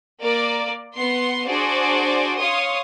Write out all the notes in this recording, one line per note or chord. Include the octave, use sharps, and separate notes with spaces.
A#3 A#4 D5
B3 F#5 C6 C7
D4 F#4 G#4 C5 D5
C#5 F5 C6 D#6